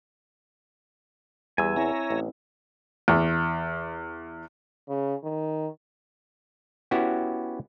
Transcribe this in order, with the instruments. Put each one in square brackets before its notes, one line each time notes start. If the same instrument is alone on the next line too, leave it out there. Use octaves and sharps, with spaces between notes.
[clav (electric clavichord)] E2 [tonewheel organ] G3 [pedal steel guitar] G#5 E6
[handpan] C4 E4 [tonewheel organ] C#5 E5 A#5
[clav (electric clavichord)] A1
[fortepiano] E2
[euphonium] C#3
D#3
[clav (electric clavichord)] B3 C#4 E4 F#4 G4